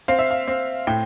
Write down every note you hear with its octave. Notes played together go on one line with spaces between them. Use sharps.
C4 F5
E5
F5
C4
A2 G5